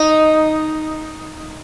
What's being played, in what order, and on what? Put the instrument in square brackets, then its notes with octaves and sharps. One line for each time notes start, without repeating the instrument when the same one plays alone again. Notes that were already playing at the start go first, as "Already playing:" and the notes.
Already playing: [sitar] D#4